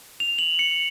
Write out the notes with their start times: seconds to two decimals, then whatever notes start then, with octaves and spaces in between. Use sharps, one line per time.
0.20 F7
0.39 F#7
0.59 C#7